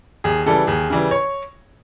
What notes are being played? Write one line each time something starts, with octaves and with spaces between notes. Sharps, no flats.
D#2 G#4
C#3 E3 G3 A4
D#2 G#4
C#3 E3 G3
C#5